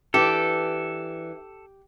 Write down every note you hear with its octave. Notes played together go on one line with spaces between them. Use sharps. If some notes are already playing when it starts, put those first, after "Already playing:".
E3 D4 G4 A4